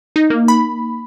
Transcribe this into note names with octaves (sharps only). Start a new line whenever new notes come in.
D#4
A#3
B5